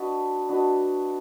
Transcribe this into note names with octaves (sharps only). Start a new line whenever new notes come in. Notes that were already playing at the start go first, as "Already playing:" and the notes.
Already playing: D4 F#4 B4 D#5
D4 F#4 B4 D#5